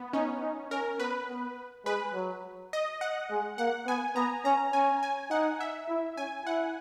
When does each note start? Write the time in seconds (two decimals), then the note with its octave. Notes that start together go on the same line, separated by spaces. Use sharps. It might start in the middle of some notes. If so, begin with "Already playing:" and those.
Already playing: B3
0.13 C#4 D#4
0.42 D#4
0.71 C#4 A#4
1.00 B3 B4
1.28 B3
1.86 G#3 B4
2.14 F#3
2.73 D#5
3.01 F#5
3.31 G#3
3.58 A#3 F#5
3.87 B3 G#5
4.16 B3 A#5
4.45 C#4 A#5
4.73 C#4 G#5
5.03 G#5
5.31 D#4 F#5
5.60 E5
5.89 E4
6.17 C#4 G#5
6.46 E4 F#5